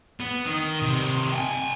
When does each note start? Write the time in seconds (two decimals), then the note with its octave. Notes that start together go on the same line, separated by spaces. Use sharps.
0.20 B3
0.47 D#3
0.82 C3 D#3
1.32 G5 G#5